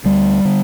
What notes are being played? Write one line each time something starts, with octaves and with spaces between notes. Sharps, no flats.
D2 G3
D3